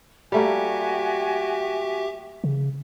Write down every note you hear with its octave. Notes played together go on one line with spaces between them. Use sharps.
G3 A3 A#3 F#4 G4 E5 G5 G#5
C#3